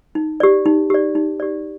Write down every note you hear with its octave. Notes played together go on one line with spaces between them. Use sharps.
D#4
G4 D5
D#4
G4 D5
D#4
G4 D5